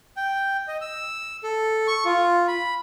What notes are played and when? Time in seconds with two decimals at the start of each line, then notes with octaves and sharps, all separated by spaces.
0.17 G5
0.68 D#5
0.81 E6
1.43 A4
1.87 C#6
2.05 F4
2.48 B5